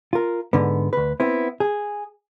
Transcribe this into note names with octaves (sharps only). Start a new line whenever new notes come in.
F4 A#4
G#2 D3 B3
D2 B4
B3 C4 E4
G#4